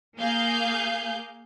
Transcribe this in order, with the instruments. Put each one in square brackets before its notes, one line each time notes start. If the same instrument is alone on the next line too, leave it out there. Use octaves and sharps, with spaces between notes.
[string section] A#3 G#4 F5 G6